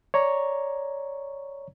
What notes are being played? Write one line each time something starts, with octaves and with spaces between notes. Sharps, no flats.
C#5 D5 A#5 C#6